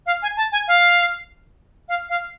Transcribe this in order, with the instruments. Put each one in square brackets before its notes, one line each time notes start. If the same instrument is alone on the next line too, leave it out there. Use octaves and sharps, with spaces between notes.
[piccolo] F5
G#5
A5
G#5
F5
F5
F5